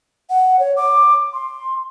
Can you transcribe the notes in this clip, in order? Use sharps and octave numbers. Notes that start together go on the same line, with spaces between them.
F#5
C#5
D6
C6